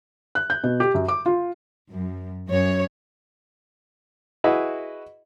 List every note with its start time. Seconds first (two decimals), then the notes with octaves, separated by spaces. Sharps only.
0.35 F#6
0.50 G6
0.64 B2
0.80 G4
0.95 F#2
1.08 D6
1.26 F4
1.90 F#2
2.48 F#2 C#5
4.44 E4 F#4 G#4 B4 D#5 E5